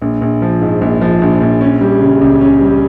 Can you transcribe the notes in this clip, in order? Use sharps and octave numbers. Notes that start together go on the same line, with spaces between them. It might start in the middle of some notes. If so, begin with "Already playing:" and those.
A#1
A#1
F3
G#2
A#1
F3
A#1
A#1
C#4
G3
C#3
C#2
C#4
G3